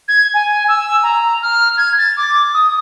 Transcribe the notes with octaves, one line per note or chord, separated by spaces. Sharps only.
G#6
G#5
E6
A#5
F6
G#6
A6
D6
D#6